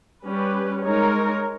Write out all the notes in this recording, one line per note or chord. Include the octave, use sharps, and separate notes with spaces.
G3 C#4 G4 B4
G#3 D#4 A#4 C#5